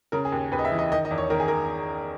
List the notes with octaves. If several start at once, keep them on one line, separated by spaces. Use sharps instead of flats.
C#3 A#4
G#4
D#2
D#2 B4
D#5
E5
E3
D#5
D#3 D#5
D#5
E2
C#5
D#3 A#4
G#4
A#4